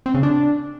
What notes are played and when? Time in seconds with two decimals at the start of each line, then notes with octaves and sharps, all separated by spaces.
0.06 C4
0.14 C#3
0.23 D4